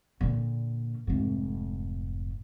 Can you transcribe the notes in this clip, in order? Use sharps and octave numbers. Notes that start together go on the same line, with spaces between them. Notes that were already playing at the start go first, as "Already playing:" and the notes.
A#2 D3
F1 G#2